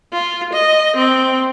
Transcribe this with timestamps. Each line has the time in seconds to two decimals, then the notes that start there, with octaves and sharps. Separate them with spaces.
0.13 F4
0.53 D#5
0.97 C4